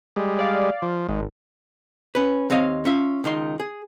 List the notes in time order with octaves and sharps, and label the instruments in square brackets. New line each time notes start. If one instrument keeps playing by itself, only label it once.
[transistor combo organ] G3 G#3
[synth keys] D5 F5
[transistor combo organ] F3
[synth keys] G#1 [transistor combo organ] G#2
[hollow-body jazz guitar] C#4 B4
D#2 C4 C#5 D#5 F5
C#4 F4 E5
C#2 D#3 D#4 C6
G#4